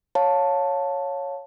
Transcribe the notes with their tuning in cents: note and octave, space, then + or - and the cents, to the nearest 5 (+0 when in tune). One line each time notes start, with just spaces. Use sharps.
C#5 +0 F5 +20 A5 +5